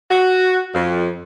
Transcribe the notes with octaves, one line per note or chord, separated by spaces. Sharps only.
F#4
F2